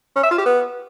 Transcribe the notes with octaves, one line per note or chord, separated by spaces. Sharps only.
C#4
E5
F4
G4
B3